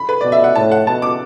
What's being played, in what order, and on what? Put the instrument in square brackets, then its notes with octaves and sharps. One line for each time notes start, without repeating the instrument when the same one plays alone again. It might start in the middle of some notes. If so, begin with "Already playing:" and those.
Already playing: [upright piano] B5
B4
[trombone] B2 [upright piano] D5
[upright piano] E5
F#5
[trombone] A2 [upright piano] A5
[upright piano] F#5
[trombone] B2 [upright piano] A5
[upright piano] D6